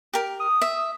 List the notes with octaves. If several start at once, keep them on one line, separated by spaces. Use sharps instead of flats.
G4 A#4
D#6
E5